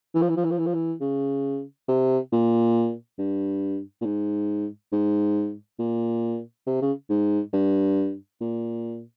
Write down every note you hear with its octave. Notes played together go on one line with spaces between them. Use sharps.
E3
F3
E3
F3
E3
F3
E3
F3
E3
C#3
C3
A#2
G2
A#2
G#2
G#2
A#2
C3
C#3
G#2
G2
A#2